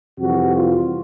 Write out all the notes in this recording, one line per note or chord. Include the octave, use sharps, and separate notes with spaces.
F2 C3 E3 G3 F#4
F4